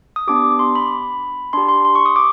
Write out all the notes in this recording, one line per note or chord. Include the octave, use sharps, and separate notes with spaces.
D#6
B3 D4 G4 D6
C6
B5
D4 G4 C6
C6
C6
C#6
D#6
D6